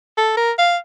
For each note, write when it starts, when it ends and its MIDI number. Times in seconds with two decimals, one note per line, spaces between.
0.17 0.32 69
0.37 0.52 70
0.59 0.77 77